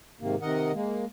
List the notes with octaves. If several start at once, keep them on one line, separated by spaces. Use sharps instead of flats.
G#2 C3 D#3 A#3
C3 D#3 A#4 D#5 F#5
G#3 A#3